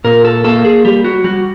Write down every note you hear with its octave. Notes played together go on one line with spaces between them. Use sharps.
A#2 A#4
A4
A#3 A4
G#4
G3 G4
F#4
G3 F#4